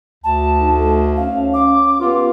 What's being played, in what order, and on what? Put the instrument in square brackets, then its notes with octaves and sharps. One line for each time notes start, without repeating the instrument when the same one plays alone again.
[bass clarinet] D2 [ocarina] A5
[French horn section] A3 D#4
[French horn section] C#4 [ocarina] F5
[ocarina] D6
[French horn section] B3 G4 B4 [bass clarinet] F4